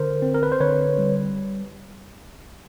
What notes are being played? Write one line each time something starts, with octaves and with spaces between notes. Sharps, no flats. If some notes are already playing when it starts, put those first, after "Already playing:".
Already playing: D3 A#4 C5
C4
A#4
B4
C5
D3 B4 C#5
G3